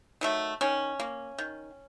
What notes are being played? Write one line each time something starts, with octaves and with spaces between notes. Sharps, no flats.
D#3 F#3 A3
D#3 C#4
A#3
D#3